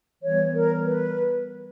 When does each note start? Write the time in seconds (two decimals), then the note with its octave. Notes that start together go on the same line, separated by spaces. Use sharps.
0.23 E3 G3 B3 C#5
0.54 A#4
0.86 B4